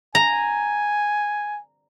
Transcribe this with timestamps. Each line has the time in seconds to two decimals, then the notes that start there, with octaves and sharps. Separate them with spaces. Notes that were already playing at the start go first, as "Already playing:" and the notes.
0.15 G#5 A#5